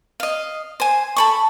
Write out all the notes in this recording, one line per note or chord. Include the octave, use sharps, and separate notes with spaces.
D#5 F5
C5 G#5
A4 B5 C#6